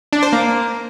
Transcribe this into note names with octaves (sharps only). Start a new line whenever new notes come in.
D4
C5
A#3